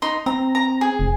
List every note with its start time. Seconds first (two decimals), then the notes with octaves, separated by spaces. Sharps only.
0.02 D#4 C6
0.26 C4 A#5
0.55 A#5
0.81 G#4
0.99 F1